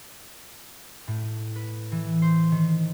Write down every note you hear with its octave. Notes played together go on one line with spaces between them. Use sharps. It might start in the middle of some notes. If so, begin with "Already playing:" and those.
A2
B4
E3
C5
D#3